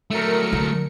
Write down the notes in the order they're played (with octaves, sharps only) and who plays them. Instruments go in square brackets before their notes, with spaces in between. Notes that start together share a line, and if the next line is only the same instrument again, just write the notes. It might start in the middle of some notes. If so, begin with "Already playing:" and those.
[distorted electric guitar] F#3 A3 [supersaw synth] A#4 C#7
[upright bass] D3